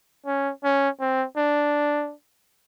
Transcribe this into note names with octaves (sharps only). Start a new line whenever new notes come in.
C#4
C#4
C4
D4